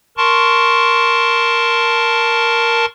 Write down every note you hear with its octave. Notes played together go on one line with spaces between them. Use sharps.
A#4 A5 C6 C#6